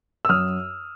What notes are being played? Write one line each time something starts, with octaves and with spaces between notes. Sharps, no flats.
E6
F#2 D#6 F6